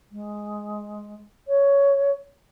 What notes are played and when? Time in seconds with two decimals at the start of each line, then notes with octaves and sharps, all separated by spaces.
0.11 G#3
1.48 C#5